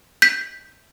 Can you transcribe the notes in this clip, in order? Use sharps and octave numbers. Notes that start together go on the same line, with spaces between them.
G6 B6